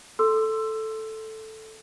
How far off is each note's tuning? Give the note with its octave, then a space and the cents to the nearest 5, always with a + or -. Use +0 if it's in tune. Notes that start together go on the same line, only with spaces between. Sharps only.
A4 +0 C6 +0 E6 +15